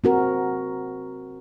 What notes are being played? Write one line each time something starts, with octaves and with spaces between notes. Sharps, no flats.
C4 F#4 A#4